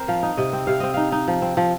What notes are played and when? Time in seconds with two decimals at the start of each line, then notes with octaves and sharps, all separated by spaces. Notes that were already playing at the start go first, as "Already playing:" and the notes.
Already playing: C4 A#4 C5
0.08 F3 F5
0.23 D#4
0.37 C3 D#5
0.53 C4
0.67 C3 F5
0.80 C4 D#5
0.94 D#4 F5
1.12 D#4
1.28 F3
1.42 C4
1.57 F3